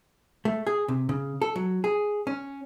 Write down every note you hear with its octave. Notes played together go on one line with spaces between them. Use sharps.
A3
G#4
C3
C#3
A4
F#3
G#4
C#4